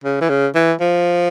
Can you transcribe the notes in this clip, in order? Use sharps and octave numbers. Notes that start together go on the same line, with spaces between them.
C#3
E3
C#3
E3
F3